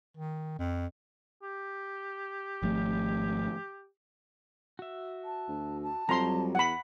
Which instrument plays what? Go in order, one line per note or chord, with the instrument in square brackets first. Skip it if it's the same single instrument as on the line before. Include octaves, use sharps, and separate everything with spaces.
[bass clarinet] D#3
F2
[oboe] G4
[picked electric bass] G#1 F3 A3
[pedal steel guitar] F#4 E5
[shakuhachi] A5
[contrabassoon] D2
[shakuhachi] A5
[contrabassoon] F2 [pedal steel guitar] F#3 G3 [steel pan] A#5 C6
[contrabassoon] E2 [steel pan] F#5 B5